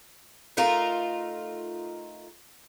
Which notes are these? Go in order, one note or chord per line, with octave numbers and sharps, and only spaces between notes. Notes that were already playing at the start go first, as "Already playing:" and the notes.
A3 D#4 F4 A#4